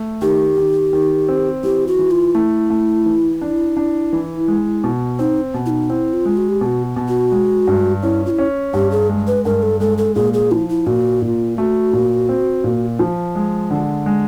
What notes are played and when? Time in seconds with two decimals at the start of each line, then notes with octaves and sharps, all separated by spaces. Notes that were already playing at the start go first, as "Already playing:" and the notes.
Already playing: A3
0.22 D#3 G4
0.57 D#3
0.93 D#3
1.28 C4
1.63 E3 G4
1.87 F#4
1.99 E3
2.11 F4
2.35 A3 E4
2.70 A3
3.06 E3
3.41 D4
3.77 D4
4.13 E3
4.48 G#3
4.84 B2
5.19 C4 D#4
5.54 B2
5.66 E4
5.70 D#4
5.90 C4 E4
6.13 F4
6.25 G#3
6.37 F#4
6.49 G4
6.61 B2 F#4 G4
6.96 B2
7.08 F#4
7.32 G#3
7.67 G2
8.03 C#4 E4
8.26 F4
8.30 E4
8.39 C#4
8.73 G2 G4
8.92 G#4
9.09 G#3
9.27 B4
9.45 G2 A#4
9.63 A4
9.80 G#3 A4
9.98 A4
10.15 A#2 G#4
10.33 G#4
10.51 F3 E4
10.69 E4
10.86 A#2 F#4
11.22 A#2 F#4
11.26 F4
11.58 A3 F#4
11.93 A#2
12.29 C4
12.64 A#2
12.99 F3
13.35 G#3
13.71 D3
14.06 G#3